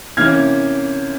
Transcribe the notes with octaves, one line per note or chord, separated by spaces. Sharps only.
C3 E3 A#3 C#4 F6 G#6